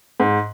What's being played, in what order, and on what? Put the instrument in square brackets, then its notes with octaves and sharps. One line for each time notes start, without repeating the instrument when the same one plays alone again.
[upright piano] G#2